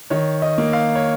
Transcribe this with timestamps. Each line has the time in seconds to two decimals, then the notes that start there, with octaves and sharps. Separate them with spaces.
0.10 D#3 C#5
0.42 D#5
0.58 A#3
0.73 F5
0.95 C#5